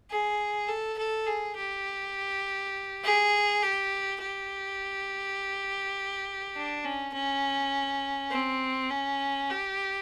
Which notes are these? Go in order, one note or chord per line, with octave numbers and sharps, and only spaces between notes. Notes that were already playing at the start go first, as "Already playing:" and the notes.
G#4
A4
A4
G#4
G4
G#4
G4
G4
D4
C#4
C#4
C4
C#4
G4